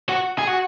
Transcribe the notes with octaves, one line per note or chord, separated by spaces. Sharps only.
F#4
G#4
F#4